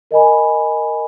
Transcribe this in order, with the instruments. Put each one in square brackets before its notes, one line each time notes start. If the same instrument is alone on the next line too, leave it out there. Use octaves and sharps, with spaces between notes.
[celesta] A#4 D#5 G#5 B5